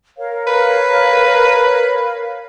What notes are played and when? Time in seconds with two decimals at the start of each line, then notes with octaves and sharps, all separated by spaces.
0.17 A#4 C#5 F5
0.47 B4